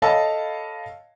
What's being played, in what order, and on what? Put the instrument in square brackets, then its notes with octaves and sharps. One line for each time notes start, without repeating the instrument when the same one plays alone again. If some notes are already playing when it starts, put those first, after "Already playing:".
[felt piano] A4 C#5 D#5 F5 A5 B5